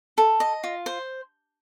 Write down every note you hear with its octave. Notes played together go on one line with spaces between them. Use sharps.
A4
D#5
F4
C5